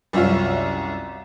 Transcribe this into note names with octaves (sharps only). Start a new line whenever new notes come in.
C2 F#2 F4 C#5 E5 F5